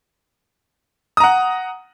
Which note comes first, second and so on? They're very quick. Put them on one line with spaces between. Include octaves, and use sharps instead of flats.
D#6 A#5 F#5